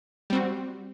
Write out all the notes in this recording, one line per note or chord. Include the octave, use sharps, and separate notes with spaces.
G3 C4 F#4